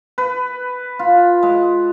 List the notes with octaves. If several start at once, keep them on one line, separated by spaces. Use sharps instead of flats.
B4
F4
G#3